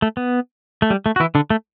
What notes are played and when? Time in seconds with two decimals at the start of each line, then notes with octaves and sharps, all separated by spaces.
0.02 A3
0.17 B3
0.82 A3
0.90 G3
1.06 A3
1.16 F#4
1.20 E3 E4
1.35 D3 D4
1.50 A3